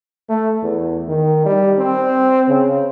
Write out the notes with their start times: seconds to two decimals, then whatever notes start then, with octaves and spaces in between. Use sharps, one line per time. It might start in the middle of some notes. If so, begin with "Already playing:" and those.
0.29 A3
0.63 E2
1.08 D#3
1.45 G3
1.79 C4
2.49 C#3